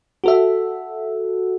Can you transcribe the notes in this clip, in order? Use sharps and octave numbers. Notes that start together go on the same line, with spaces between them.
F#4 A4 E5